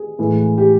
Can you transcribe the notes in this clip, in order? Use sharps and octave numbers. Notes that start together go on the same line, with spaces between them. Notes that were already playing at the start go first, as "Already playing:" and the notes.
Already playing: G#4
A2 E3 G#3
G4